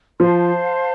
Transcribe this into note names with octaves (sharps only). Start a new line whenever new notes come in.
F3 C5 F5 A5 C6